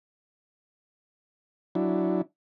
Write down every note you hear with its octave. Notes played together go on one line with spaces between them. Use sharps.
F#3 D4 E4